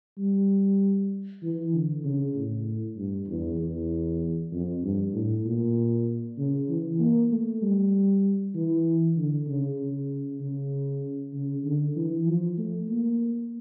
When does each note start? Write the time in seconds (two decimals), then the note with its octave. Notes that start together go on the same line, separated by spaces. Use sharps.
0.18 G3
1.43 E3
1.73 D3
2.04 C#3
2.35 A2
2.97 G2
3.28 E2
3.59 E2
4.52 F2
4.83 G2
5.14 A2
5.45 A#2
6.38 C#3
6.69 E3
7.00 A#3
7.31 A3
7.62 G3
8.55 E3
9.17 D3
9.48 C#3
9.79 C#3
10.41 C#3
11.33 C#3
11.65 D3
11.96 E3
12.27 F3
12.58 A3
12.89 A#3